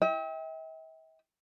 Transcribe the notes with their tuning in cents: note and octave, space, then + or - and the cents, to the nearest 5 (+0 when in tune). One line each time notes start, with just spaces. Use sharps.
E5 -45 G5 +10